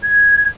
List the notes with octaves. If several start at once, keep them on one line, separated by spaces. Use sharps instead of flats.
G#6